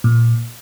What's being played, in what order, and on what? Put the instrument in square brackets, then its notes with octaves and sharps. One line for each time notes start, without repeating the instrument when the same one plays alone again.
[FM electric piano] A#2